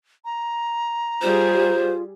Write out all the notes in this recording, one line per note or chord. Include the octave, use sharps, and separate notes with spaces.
A#5
G3 F4 G#4 C5